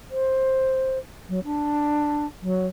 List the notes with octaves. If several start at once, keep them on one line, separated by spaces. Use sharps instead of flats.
C5
F#3
D4
F#3